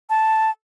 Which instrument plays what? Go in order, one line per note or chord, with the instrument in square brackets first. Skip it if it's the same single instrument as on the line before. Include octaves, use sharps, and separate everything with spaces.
[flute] A5